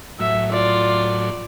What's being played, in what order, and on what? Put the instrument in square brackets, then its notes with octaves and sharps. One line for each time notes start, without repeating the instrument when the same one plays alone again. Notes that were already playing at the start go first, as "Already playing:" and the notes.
[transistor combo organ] A2 F#3 [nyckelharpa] E5
[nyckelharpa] F4 D5